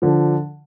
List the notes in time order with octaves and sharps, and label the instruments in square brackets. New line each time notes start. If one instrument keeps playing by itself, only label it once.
[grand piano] D3 F3